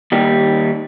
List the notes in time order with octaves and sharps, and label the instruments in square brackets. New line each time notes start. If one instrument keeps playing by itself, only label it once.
[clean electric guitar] D#2 G3